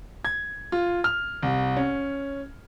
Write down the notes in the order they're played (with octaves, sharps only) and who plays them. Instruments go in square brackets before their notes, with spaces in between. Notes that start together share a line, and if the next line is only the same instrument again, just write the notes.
[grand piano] G#6
F4
F6
C2
C#4